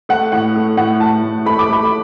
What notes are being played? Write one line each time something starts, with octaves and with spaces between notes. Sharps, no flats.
A3 F#5
A2 F#5
A3
A2 F#5
A2 A5
A2
A3 B5
D6
A3 B5